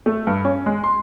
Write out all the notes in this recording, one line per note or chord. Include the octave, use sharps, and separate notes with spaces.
A3
G2
C#4
G#3
C6